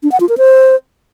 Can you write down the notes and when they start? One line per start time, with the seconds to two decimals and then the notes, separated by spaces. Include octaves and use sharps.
0.03 D4
0.12 F#5
0.20 F4
0.29 A#4
0.38 C5